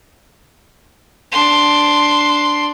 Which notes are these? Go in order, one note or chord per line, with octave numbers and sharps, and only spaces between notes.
D4 C6